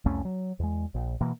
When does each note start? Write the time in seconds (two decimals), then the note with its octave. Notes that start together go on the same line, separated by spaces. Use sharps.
0.06 C2 F2 A3 C#4
0.25 F#3
0.59 E2 G#3
0.94 A#1
1.21 B2 E3 A#3